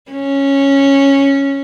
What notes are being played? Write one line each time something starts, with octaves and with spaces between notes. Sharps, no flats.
C#4